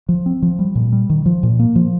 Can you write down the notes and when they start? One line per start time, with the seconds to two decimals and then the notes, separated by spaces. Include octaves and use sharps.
0.09 F3
0.26 C4
0.42 F3
0.59 G3
0.75 A#2
0.93 G3
1.10 D#3
1.26 F3
1.43 A#2
1.59 A#3
1.76 F3